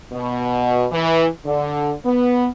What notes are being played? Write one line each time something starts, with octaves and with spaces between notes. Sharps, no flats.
B2
E3
D3
B3